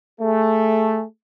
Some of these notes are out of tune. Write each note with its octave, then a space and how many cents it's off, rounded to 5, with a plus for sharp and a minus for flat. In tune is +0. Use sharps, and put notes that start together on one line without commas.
A3 +0 G#4 +0